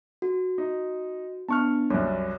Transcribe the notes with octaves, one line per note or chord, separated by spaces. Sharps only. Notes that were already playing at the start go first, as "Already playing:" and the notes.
F#4
D#4
B3 D4 A5 C#6 F6
C2 F#2 C#5